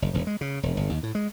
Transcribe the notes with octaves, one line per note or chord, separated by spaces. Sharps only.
F#1
E1
G#3
C#3
E1
G1
D#2
A2
G#3